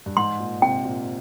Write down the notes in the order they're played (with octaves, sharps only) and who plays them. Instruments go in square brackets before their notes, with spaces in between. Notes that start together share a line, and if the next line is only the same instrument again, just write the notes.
[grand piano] G2
[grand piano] G#2 [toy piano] C6
[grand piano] A#2
[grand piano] C3 [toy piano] G5
[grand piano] A#2